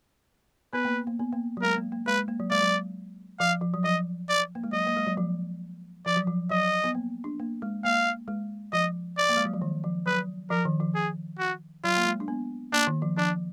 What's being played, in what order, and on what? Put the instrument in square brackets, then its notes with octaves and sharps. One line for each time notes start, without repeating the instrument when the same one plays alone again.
[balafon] B3 [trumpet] B4
[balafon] A#3
A#3
B3
A#3
F#3
[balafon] G#3 [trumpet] A#4
[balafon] A#3
A#3
[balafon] G#3 [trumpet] B4
[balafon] G#3
A#3
F#3
[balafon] G#3 [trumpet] D5
[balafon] F#3
[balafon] F3 [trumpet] F5
[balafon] F3
F#3
[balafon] F3 [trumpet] D#5
[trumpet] D5
[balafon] A#3
G#3
[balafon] F#3 [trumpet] D#5
[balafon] A#3
G#3
F#3
F3
[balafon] F3 [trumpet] D5
[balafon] F#3
F3
[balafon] F#3 [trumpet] D#5
[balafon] B3
A#3
D4
A#3
G#3
[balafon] A#3 [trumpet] F5
[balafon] G#3
[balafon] F3 [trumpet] D#5
[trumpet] D5
[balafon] A#3
G#3
F#3
F3
D#3
F3
[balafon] F#3 [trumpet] B4
[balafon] F3 [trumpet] A#4
[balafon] D#3
F3
[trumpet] G#4
F#4
[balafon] F#3 [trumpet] F4
[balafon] A#3
G#3
D4
B3
[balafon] A#3 [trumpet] D4
[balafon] D#3
F3
[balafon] F3 [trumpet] D4